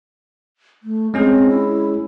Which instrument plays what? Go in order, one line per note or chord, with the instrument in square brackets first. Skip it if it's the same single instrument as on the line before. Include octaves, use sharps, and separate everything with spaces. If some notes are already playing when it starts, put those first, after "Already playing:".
[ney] A3
[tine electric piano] G#3 C#4 G#4 [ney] C4
[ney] E4